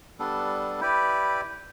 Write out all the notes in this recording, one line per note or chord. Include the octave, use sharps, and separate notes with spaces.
G3 B3 D4 A4
E4 G4 B4 D5